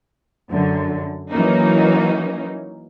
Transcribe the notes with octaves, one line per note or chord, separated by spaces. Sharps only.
F#2 D3
E3 F#3 A#3 C#4 D#4